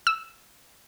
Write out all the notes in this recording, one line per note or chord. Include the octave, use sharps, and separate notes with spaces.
E6